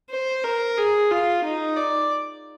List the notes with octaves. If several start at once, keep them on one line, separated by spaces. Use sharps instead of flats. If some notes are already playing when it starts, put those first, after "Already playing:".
C5
A#4
G#4
F4
D#4
D5